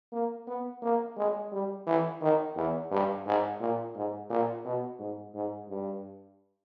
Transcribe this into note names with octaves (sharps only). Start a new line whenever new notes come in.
A#3
B3
A#3
G#3
G3
E3
D#3
E2
G2
G#2
A#2
G#2
A#2
B2
G#2
G#2
G2